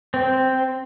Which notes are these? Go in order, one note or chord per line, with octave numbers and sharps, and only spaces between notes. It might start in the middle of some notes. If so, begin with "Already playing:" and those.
C4